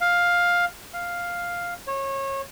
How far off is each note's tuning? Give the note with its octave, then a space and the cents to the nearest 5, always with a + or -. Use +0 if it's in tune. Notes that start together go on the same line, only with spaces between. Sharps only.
F5 +10
F5 +0
C#5 -25